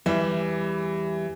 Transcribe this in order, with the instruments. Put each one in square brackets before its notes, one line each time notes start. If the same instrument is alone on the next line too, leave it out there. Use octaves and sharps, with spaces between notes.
[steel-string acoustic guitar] E2 G3 E5 [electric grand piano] E3